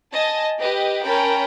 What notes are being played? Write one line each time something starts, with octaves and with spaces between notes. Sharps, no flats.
D#5 G#5 A5
G4 B4 D#5
C#4 A#4 G5 A5 B5